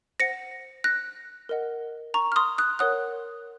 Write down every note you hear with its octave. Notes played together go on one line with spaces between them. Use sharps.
C5 F#5 A#6 C#7
F#6 A#6
A#4 D#5 F#5
A#5 C#6
F6
C6 D#6
D#6 F#6
A#4 C#5 F#5 D#6 F#6